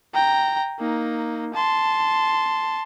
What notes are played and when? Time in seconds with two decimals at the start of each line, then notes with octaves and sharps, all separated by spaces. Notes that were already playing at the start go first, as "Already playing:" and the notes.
0.14 G5 A#5
0.79 A#3 D#4
1.54 A5 C6